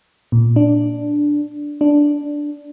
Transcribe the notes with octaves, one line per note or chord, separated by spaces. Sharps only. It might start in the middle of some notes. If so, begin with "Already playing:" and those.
A#2
D4
D4